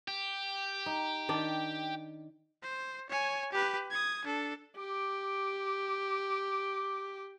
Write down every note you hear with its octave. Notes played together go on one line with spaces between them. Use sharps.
G4
D#4
D#3 D4 D5
C5
C#5 G#5
G4 B4
D#6 G#6
D4 A4
G4 D6